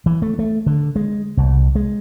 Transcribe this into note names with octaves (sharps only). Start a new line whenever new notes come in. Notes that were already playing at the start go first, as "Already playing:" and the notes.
E3
A3
A3
D3
G#3
C2
G#3